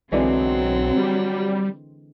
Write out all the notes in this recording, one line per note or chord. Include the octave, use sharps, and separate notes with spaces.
B1 D3 E3 F#3 G#3 C4
G3